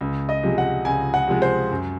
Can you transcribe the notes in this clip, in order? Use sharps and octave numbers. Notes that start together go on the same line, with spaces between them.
C#2
D#5
C3 F3 G#3
F#5
C#2 G#5
F#5
C3 F3 G#3
C5
F#2